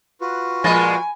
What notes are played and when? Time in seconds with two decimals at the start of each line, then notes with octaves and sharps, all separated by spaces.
0.21 F4 F#4 B4
0.64 A#2 F3 G#3 G#5 B5 A6 A#6